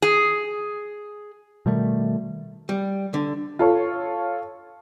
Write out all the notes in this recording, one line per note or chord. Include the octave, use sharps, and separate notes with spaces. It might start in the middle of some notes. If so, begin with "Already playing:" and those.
G#4
B2 D#3 G3 A3
G3
D3
F4 A4 C#5